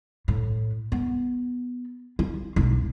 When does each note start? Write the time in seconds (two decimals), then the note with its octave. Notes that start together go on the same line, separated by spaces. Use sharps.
0.28 A2
0.92 B3
2.19 F4
2.56 E1 B1